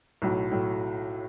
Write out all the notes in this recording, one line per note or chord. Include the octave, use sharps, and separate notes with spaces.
B1 A2 F#3
A2 F#3